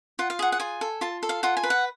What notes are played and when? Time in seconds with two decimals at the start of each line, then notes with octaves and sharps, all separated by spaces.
0.19 F4 F#5
0.30 F5
0.39 G#4 F#5
0.52 F#5
0.60 F4 G#5
0.81 A4
1.01 F4 A5
1.23 A4
1.29 F5
1.43 F4 F#5
1.57 G#5
1.63 B4
1.70 F#5